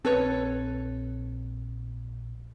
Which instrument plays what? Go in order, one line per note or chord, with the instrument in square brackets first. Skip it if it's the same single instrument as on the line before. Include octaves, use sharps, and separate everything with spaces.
[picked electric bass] A#1 C4 [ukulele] A4 B4 C#5